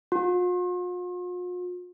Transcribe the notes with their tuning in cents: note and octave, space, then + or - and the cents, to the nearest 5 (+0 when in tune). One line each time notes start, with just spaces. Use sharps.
F4 +45